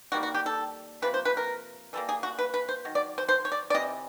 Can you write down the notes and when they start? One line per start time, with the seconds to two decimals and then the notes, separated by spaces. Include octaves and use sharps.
0.12 D#3 G3 A#3 F#4
0.23 F#4
0.34 G4
0.46 A4
1.02 C3 F3 A#3 B4
1.14 C5
1.25 B4
1.37 A#4
1.93 E3 G3 A#3 A4
2.09 G#4
2.23 F#4
2.39 B4
2.54 B4
2.69 C5
2.85 D#3 F#3
2.95 D5
3.18 C5
3.29 C5
3.45 C#5
3.52 D5
3.70 D5
3.74 C3 E3 D#5